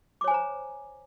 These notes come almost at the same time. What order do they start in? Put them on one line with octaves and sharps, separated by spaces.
D6 C#5 G#5 C5 A#5